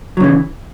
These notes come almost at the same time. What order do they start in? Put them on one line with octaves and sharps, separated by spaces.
F#3 C#3 E3